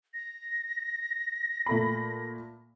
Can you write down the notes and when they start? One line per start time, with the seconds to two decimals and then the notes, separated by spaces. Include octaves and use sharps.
0.14 A#6
1.66 A#2 A3 B5